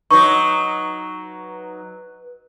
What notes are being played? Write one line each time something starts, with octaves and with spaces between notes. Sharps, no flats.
F#3 D#4 B4 C#6